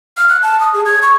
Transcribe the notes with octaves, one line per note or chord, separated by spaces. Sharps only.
F6
F#6
A5
D#6
G#4
G#6
C#6